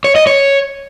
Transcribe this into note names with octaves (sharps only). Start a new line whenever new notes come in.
C#5
D#5
C#5